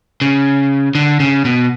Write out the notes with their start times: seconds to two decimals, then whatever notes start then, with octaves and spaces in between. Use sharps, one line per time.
0.21 C#3
0.95 D3
1.20 C#3
1.45 B2